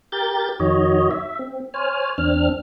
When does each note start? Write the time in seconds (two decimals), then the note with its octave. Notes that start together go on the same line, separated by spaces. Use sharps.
0.12 G4 A#4 G6 A6
0.60 F2 D#3 F#4 C#5 D#5
1.11 E5
1.39 C4
1.74 C5 C#5 G#5 F6
2.18 E2 C4 D4 F6